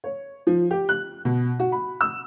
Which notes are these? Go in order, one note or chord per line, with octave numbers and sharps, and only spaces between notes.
C#5
F3
G4
F#6
B2
F#4
B5
E6